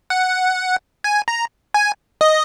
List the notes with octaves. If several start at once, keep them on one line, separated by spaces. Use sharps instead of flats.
F#5
G#5
A#5
G#5
D#5